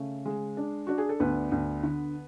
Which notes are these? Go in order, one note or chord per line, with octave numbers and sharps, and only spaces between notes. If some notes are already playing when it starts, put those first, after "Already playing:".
Already playing: C#3 A3
G#3
D4
D4 F#4
G#4
A4
D2 B3 B4
D2
D3